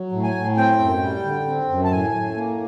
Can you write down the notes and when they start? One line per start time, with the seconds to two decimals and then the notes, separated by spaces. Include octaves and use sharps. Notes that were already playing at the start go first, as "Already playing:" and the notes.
Already playing: F#3
0.12 A2
0.23 G#5
0.35 A2
0.57 C4 G5
0.80 F#2
1.02 G3
1.24 D3
1.46 C4
1.69 F#2
1.84 A5
1.91 A2 G#5
2.14 A2
2.36 A#3